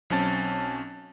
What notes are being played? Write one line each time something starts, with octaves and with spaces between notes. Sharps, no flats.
B1 F#3 C4 C#4 A5 A6